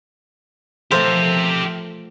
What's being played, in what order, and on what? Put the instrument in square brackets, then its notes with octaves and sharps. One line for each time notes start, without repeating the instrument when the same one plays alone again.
[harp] F3 A3 [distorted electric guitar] G4 E5 [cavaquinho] A4 A#4 C5